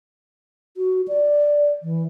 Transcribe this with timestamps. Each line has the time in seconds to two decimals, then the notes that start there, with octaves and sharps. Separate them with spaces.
0.77 F#4
1.08 D5
1.83 E3